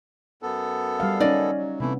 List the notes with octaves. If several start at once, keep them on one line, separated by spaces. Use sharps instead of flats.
F#2 B3 A4
G3 F5
C#4 D#4 D5 D#5
F#3
C3 E3 A3 B3 E4